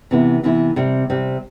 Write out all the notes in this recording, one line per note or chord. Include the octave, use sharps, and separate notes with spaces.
C3 E3 B3 E4
C3 E3 B3 E4
C3 G3 C4
C3 G3 C4